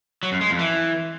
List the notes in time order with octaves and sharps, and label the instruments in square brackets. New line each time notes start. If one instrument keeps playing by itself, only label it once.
[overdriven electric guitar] F#3
F#2
G#3
F2
E3